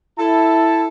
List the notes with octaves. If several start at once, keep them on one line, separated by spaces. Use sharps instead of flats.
E4 A4 A5